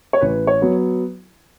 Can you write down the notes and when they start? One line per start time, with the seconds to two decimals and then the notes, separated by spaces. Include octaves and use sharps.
0.13 C#5
0.21 A1 B4
0.47 C#5
0.62 F#3 B3